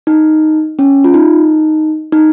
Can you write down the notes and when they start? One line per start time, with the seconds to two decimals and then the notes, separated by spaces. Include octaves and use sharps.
0.07 D#4
0.79 C#4
1.04 F4
1.14 D#4
2.12 D#4